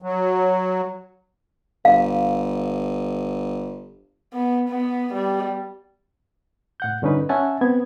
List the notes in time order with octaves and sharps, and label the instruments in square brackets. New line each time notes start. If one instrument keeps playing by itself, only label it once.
[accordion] F#3
[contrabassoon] G1 [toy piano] F5
[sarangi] B3
B3
G3
[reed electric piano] A2 F#5 G6
G2 D3 C#4 D#4 B4
C#4 E5 F#5 G#5 A5
B3 C4 G#6